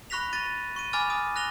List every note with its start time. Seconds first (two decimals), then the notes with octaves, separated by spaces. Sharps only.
0.10 B5 C#6 F#6 A#6 B6 F7
0.33 C#6 A6 A#6 D#7
0.76 C#6 D#7
0.93 G#5 B5 D6 F6 A6
1.10 G#5 D#6 F6
1.36 F#6 A#6 F7 G7